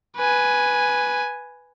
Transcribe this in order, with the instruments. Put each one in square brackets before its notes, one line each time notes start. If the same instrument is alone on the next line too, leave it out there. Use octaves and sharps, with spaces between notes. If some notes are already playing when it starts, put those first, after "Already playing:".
[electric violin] B4 G#5